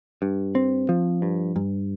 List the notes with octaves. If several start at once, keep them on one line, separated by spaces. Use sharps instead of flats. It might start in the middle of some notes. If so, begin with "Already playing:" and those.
G2
C4
F3
G2
G2